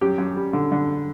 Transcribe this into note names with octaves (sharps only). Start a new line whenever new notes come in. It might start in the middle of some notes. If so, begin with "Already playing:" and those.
F#2 G4
F#2
G3
D3
D3